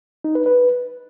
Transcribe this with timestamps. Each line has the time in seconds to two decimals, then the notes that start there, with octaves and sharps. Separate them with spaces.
0.24 D#4
0.35 B4
0.46 B4